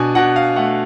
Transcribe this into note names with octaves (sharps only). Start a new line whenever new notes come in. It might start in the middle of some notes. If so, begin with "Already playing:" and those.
Already playing: B2 D4 G#5
B2 F#5
F5
A3 F#5